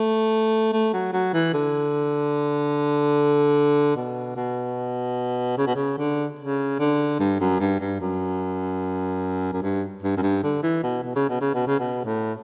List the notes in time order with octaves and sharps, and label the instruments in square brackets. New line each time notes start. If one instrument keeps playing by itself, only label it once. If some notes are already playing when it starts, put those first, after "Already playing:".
Already playing: [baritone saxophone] A3
A3
F#3
F#3
E3
D3
B2
B2
C#3
B2
C#3
D3
C#3
D3
G2
F#2
G2
G2
F#2
F#2
G2
G2
F#2
G2
D3
E3
B2
B2
C#3
B2
C#3
B2
C#3
B2
A2